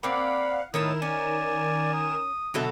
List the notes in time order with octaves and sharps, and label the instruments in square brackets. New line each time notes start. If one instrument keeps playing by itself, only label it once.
[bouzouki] A#3 C4 D5 [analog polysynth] F5 F#5 [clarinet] B5
[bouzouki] A2 C#5 A5 [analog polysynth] D#3 A#4 E7 [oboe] E4 [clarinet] D#6
[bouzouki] C#4 [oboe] D5 [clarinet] G#5
[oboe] D#6
[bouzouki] B2 F#3 A4 [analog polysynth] D3 F#4 E5